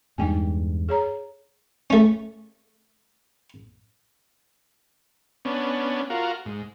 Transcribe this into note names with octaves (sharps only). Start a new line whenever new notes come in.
E2 G2 G#3 D#4 G5 G#5
G#4 C#5 A#5
A3 C#4
B3 C#4 D4
F4 F#4 A#4
G#2